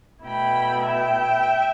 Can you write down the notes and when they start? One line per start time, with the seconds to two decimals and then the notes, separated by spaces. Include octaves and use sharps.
0.25 B2 A3 E4 G5 B5
0.86 E5 G5